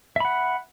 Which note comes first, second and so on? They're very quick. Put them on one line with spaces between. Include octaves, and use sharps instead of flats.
E5 B5 F#5